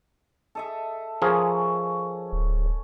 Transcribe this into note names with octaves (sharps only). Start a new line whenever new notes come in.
A4 D#5 E5
F3 C#4 G#4 A#4
D1